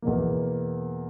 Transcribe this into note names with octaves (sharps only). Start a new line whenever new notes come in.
E2 B2 A#3